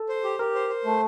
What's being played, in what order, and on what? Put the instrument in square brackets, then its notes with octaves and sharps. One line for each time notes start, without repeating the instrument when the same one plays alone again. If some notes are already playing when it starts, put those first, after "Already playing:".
Already playing: [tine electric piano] A4
[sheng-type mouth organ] C5
G4
[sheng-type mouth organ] G4 [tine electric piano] A#4
[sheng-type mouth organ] C5
C5
A3